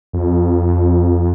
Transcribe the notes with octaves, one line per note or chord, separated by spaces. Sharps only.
F2